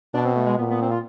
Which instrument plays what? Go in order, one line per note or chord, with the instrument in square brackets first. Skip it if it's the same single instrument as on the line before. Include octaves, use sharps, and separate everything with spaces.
[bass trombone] B2 [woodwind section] D4
[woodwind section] C4
A3
G#3
[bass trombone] A#2 [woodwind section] B3
[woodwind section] B3
C4
F4